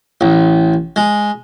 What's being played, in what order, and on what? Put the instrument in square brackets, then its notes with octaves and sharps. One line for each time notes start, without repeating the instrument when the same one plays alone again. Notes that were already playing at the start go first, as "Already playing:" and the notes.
[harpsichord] A1
G#3